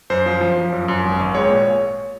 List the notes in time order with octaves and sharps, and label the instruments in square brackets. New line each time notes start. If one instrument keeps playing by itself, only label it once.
[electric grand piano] F#2 C5
F3
F3
F3
F#2
F#2
G#1
G#1
G#3 C#5
A#2